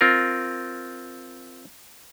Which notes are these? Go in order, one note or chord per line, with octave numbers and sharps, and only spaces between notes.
C4 F4 A#4